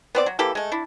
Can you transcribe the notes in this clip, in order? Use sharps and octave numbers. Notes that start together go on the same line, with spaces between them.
B3 C4 D5
F#3 F#4
E3 A#3 G4 A4
G#3 A3
D4 E4